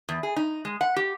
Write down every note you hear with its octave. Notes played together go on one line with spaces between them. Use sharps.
E2
G#4
D#4
G#3
F#5
G4